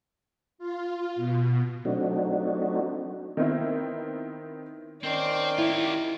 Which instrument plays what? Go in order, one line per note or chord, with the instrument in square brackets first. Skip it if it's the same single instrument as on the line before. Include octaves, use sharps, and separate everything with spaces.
[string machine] F4
B2
[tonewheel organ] F#3 A3 C4 D4 D#4 F#4
[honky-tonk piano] D#3 B3 C4 E4
[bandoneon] D#3 [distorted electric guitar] C4 C5 [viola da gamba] C#4 D5
[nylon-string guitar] E4 [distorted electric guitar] F4 G4